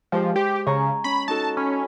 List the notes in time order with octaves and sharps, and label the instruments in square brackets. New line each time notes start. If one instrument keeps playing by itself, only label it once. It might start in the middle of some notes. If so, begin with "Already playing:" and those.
[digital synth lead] F3 [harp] G#3 G4 C5
[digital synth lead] G4 [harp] C5
[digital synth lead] C#3 [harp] G#5 A#5 C#6
[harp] C#4 [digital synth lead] B5
[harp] D#4 F#4 A4 [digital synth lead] A5
[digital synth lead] C#4 [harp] B5